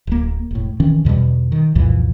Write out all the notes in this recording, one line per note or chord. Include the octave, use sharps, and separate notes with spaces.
D1 A#3
E1 A2
D#3 E3 C4 C#4
E2 B2 D3 G3
D#3
C2 F2 A#2 E3